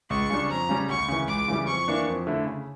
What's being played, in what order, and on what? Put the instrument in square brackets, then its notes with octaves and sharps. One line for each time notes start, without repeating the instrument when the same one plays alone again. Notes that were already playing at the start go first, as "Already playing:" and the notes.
[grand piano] C#2 [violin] C#6
[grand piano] C#3 G3 D4
[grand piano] F2 [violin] A#5
[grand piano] C#3 G3 C#4
[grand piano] D2 [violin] C#6
[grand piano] C#3 E3
[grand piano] C#2 [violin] D6
[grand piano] C#3 E3 G3
[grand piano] F2 [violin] C#6
[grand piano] E3 A#3 D4
F2
D3 A3 E4
C#3